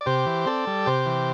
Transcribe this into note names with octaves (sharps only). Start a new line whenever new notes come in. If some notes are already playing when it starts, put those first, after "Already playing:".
D5
C3 G4 C5
E3
C4 A4 D5
G3
C3 G4 C5
E3